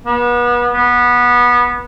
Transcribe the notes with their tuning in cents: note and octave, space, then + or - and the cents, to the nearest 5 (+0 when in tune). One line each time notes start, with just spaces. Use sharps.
B3 -35
B3 -20